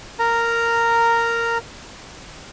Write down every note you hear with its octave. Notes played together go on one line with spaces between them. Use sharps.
A#4 A#5